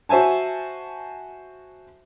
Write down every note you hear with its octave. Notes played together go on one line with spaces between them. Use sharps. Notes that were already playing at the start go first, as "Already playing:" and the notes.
F#4 C5 E5 G#5 A5